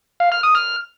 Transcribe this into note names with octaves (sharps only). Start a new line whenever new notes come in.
F5
F6
D#6
F6